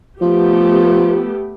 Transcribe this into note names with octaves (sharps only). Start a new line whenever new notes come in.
F3 A3 B3 G4